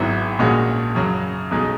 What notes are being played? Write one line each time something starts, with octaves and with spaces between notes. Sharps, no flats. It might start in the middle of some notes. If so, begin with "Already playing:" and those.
Already playing: G#1 G#2 F#3 B3 E4
A#1 A#2 G#3 C#4 F#4
F#2 C#3 F#3
B1 B2 G#3 D#4